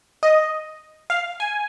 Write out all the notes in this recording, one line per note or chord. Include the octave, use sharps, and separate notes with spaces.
D#5
F5
G#5